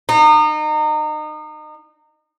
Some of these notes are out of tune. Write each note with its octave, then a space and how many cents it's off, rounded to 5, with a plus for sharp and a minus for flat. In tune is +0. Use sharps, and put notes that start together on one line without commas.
D#4 -30